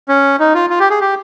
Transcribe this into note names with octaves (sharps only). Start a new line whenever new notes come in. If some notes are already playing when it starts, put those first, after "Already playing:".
C#4
D#4
F4
F4
G4
G#4
G4